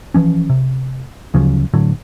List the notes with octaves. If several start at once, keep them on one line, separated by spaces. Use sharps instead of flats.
E3 F3 C#4
C3
D2 C#3 F3 F#3
A2 D3 F#3